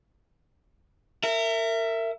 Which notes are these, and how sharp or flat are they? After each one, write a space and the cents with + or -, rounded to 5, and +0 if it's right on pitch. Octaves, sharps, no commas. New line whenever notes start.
A#4 -30 E5 +10